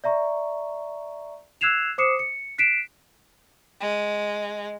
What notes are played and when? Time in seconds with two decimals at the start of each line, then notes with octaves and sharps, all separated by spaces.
0.04 D5 E5 A#5 C#6
1.61 E6 F#6 G#6 C7 E7 F7
1.98 C5 D6 D#6 C7 C#7 E7
2.19 C#7
2.58 F#6 B6 C7 D7 E7
3.81 G#3